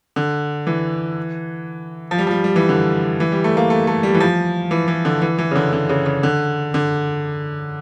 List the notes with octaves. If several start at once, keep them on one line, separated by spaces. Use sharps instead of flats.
D3
E3
F3
G3
F3
G3
G3
E3
D3
E3
G3
A3
A#3
A3
A3
G3
E3
F3
E3
E3
D3
E3
E3
C#3
D3
D3
C#3
C#3
D3
D3